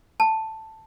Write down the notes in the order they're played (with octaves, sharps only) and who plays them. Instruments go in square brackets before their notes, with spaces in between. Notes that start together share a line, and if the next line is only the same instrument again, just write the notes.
[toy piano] A5